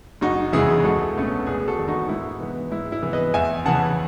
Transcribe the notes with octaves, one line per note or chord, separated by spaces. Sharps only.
F#1 D#4 F#4
E2 C#3 E3 G#3 E4 G#4
C#2 F#4 A4
B2 A3 C#4
E1 G#4 B4
F#4 A4
E2 D#3
D#4 F#4
G#2 E4
E3 B3
G#2 E4
E4
E3 B3
B4 D#5
E2 E5 G#5
C#3 E3 F#5 A5